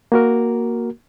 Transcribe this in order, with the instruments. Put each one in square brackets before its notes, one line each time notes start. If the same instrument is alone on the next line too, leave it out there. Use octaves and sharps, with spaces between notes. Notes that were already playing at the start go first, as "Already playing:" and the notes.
[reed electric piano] A#3 F#4 A#4